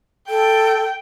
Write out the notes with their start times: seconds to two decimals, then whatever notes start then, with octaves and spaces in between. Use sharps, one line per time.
0.29 A4 G5